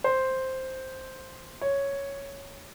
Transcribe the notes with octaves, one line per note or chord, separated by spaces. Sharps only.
C5
C#5